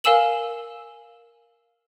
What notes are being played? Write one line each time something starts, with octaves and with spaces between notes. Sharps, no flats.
A#4 F5 G#5 E6 E7 F#7